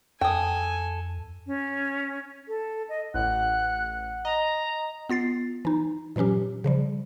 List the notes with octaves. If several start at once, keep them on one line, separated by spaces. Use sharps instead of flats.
F2 A4 G5 G#5 D#6
C#4
A4
D#5
A1 F#5 F#6
D#5 A#5
B3 F4 A6 C7
E3 D#4
A#2 E3 F#3 C#4 G4
C#3 F3 G3